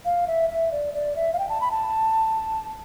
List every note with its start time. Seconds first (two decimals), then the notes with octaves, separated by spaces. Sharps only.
0.05 F5
0.27 E5
0.50 E5
0.72 D5
0.94 D5
1.16 E5
1.33 F5
1.39 G5
1.49 A5
1.61 B5
1.71 A5